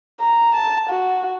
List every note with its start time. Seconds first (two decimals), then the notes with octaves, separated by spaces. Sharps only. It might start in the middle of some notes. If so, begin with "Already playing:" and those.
0.21 A#5
0.55 A5
0.90 F#4